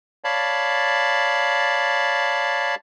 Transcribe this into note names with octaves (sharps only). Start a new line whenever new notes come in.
C#5 D5 F5 A5 B5